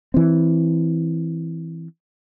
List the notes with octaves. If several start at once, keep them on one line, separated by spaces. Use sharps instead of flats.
E3 C4